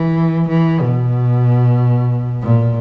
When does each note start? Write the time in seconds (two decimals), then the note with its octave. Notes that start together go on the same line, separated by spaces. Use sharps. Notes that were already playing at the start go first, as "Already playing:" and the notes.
Already playing: E3
0.48 E3
0.80 B2
2.41 A#2